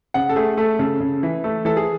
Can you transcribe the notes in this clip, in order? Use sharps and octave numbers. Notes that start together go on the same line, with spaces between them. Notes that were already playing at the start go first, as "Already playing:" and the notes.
C#3 F#5
A4
A3 G#4
A3 A4
C#3 A4
C#3
E3
A3 A4
E3 A4
G#4